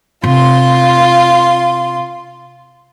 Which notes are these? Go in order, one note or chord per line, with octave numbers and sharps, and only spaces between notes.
C3 F4 C6